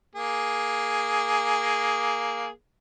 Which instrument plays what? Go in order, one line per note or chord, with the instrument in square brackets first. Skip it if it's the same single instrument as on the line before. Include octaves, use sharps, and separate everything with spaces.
[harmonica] A#3 G#4